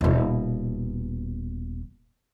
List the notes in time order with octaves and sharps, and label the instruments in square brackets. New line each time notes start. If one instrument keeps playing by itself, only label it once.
[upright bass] D#1 B2